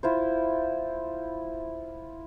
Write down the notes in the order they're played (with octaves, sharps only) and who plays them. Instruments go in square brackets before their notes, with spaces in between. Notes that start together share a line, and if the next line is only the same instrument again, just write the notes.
[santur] E4 F4 C5